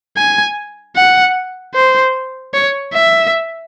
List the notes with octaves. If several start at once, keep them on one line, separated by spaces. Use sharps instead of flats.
G#5
F#5
C5
C#5
E5